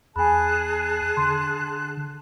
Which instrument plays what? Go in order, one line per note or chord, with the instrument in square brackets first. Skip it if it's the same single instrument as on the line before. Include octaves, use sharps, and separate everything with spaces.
[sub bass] E2 [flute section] G#4 A5 F#6 [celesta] G#5 B5
[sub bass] D3 [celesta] C6